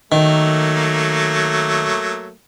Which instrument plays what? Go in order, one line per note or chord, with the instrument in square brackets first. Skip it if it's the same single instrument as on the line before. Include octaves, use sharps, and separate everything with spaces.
[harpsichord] D#3 [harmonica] F#3 A3 A#3